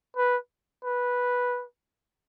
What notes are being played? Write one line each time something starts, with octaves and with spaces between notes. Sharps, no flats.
B4
B4